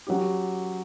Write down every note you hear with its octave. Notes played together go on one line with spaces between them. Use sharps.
F#3 C#4 G4